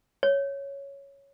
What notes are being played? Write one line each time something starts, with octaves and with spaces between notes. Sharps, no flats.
C#5